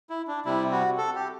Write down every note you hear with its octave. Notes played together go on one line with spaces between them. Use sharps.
E4
D4
C3 G3 E4
F#4
A4
G4